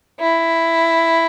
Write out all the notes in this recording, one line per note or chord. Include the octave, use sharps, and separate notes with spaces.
E4